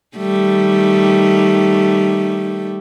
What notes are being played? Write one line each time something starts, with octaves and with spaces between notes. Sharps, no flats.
D#3 G3 A3